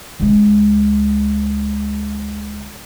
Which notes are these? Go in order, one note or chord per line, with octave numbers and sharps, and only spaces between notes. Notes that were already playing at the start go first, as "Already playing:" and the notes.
C#2 G#3